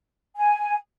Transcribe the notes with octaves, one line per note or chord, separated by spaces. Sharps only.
G#5